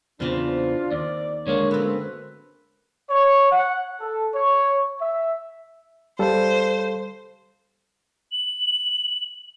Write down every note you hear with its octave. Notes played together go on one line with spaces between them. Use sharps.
E2 C#3 E3 C4 D4 F4 C5
D#2 D5
D3 G#3 A#3 C#5
F#2 B3 C4 A4 B4
C#5
F#5
A4
C#5
E5
G3 A4 C5 F5
F#7